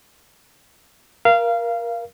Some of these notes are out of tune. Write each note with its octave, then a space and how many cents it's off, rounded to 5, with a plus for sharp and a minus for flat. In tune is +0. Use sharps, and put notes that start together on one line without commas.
A#4 +20 F5 -20